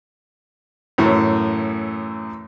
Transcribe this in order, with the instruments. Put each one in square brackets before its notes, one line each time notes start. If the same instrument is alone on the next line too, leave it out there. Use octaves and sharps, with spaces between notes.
[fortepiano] F#2 A2 E3